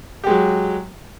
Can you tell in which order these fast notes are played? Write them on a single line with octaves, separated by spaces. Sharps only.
G4 G#3 F#3